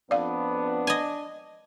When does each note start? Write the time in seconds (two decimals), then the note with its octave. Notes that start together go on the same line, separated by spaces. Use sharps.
0.11 F2 B3 D4 D5 F5
0.87 D#5 G#5